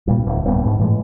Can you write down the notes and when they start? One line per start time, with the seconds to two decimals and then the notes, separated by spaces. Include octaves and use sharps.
0.08 G2 A#2
0.27 D1
0.45 D1 G2 A#2 B3
0.66 G#2
0.79 A2 E3 G#3